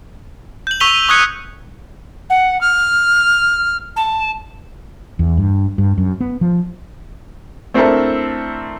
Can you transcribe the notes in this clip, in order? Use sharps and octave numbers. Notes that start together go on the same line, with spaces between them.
G6 F#7
C#6 E6 B6 D#7 F7 G7
C#6 D#6 F#6 G#6 C#7
F#5
F6
A5
E2
G2
G2
F#2
B3
F3
A3 C4 D4 E4 A4 A#4